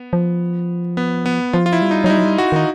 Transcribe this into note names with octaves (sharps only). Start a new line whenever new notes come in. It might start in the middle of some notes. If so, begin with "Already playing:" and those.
Already playing: B3
F3
B3
B3
F3 F4
F4
E4
G3
D#4
F#3 D#4
G3 E4
F#3
G3
F#4
D#3 D#4